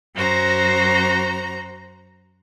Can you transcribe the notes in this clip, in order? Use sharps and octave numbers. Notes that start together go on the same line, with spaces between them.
F#2 F#4 C5 A#5